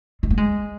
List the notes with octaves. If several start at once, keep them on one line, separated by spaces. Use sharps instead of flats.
G#3
A#3
G#3